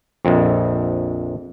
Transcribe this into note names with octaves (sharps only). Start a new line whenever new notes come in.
A#1 F2